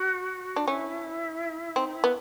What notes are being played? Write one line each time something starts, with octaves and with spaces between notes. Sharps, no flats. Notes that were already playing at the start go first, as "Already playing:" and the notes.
Already playing: F#4
D4
C#4 E4
C4 D#4
E4
B3